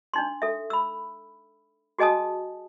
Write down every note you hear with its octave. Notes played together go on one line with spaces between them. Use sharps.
D4 D#4 C6
A4 E5
B5 E6
F#4 G#4 D#5 G#5 A5 D#6